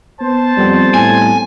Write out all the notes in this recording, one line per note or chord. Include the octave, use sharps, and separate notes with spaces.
B3 C5 A5
F2 G3 B3 C4
A2 G#5